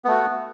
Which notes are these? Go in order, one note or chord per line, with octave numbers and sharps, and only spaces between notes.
A3 B3 F#4